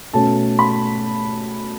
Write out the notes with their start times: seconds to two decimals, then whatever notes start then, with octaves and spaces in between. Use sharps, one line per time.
0.13 B2 A3 C#4 A5
0.59 B5